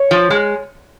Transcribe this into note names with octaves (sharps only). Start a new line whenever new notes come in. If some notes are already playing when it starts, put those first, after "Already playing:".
Already playing: C#5
F3
G#3